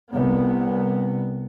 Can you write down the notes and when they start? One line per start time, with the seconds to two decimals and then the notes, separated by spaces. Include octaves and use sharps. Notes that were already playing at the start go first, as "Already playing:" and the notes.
0.13 C2 B3